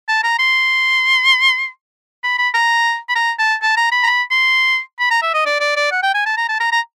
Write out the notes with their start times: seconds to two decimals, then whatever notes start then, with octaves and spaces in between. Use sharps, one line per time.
0.08 A5
0.23 A#5
0.39 C6
2.23 B5
2.38 B5
2.54 A#5
3.09 B5
3.15 A#5
3.39 A5
3.62 A5
3.77 A#5
3.92 B5
4.03 A#5
4.07 B5
4.31 C6
4.99 B5
5.10 A#5
5.22 E5
5.34 D#5
5.46 D5
5.60 D5
5.76 D5
5.91 F#5
6.03 G5
6.14 G#5
6.26 A5
6.37 A#5
6.49 A5
6.60 A#5
6.72 A#5